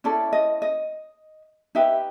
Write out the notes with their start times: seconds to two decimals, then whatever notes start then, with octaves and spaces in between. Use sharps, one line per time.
0.04 C#4 E4 A4 D5
0.33 D#5
0.62 D#5
1.75 D#4 G4 B4 E5